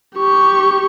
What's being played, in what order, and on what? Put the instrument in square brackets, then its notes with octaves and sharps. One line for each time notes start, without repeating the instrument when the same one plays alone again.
[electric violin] G4 C#6